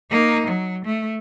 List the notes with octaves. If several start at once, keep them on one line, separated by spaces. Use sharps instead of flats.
A#3 D#4
F#3
A3